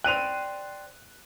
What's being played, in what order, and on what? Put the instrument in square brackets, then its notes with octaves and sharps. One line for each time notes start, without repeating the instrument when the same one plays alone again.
[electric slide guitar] C5 D5 G5 [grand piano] F#6 D#7 F7